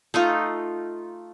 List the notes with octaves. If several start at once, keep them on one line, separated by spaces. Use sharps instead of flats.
A3 D#4 F4